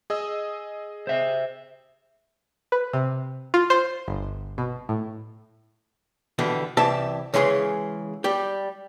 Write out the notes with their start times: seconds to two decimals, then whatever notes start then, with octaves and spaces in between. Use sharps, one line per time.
0.10 G#4 D#5 E6
1.07 C5 E5
2.72 B4
2.93 C3
3.54 F4
3.70 C5
4.08 G1
4.58 B2
4.89 A2
6.39 B2 D3 E3 G3
6.77 C2 E3 G4 E5 A5
7.34 C#3 E3 G#3 G#4 C6
8.24 G3 G4